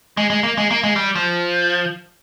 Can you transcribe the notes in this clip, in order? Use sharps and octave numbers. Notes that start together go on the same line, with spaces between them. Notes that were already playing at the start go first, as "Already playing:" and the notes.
G#3
G#3
A#3
G#3
A#3
G#3
G3
F3